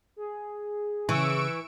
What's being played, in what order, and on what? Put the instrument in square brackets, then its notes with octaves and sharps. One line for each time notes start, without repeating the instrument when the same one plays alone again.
[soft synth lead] G#4
[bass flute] C#3 [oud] E3 [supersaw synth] C#6 E6 D7